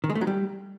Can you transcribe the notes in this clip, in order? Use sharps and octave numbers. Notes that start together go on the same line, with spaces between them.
D#3
G#3
A3
F#3
G3